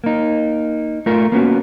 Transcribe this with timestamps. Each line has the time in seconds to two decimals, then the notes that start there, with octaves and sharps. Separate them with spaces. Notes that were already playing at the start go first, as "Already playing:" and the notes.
0.04 A#3 D#4
1.06 A3 F4 A#4
1.32 A#3 B3 C#4 F#4